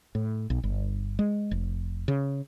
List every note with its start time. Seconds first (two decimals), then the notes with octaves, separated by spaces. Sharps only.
0.15 A2
0.50 B1
0.64 G1
1.19 G#3
1.51 F1
2.08 C#3